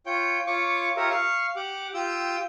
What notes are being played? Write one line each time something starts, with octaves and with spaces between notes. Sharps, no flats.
F4 C#5 G5
F4 C#5 C#6 D6
F4 G4 A#4 C#5 E5
F5 C#6
G4 F#5 D6
F4 G4 G5 E6